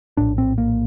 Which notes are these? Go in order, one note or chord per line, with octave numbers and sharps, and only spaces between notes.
A#1 A2 D4
C4
A#3